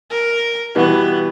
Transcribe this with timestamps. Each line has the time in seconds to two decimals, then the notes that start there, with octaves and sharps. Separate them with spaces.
0.10 A#4
0.75 B2 E3 G3 B3